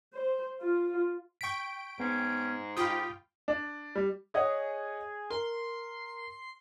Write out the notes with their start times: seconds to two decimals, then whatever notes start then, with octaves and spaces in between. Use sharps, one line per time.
0.13 C5
0.60 F4
1.41 G5 C#6 B6 D7
2.00 G#2 B3 C#4
2.77 F4 G4 G5 B5 D#6
3.48 D4
3.95 G3
4.34 G#4 C#5 D#5 F#5
5.30 A#4 C6